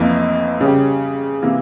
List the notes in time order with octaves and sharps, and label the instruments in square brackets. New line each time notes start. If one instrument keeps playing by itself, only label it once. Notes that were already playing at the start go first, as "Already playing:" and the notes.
Already playing: [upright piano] F1 F2 E3 A#3
C#3 G3 C#4 G4
C3 E3 A#3